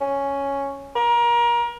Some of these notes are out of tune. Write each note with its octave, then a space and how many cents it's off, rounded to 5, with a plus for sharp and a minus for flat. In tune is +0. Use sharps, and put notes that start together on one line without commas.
C#4 +0
A#4 +30